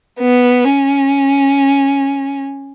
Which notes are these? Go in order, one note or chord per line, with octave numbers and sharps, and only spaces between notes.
B3
C#4